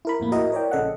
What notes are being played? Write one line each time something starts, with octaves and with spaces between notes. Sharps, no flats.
E4 A#4 B5
F2 A2 A#3
E4 F#4 A#4 D#5
A#4 C#5 D5 G5
A#1 C#3 A4 D#5 F#5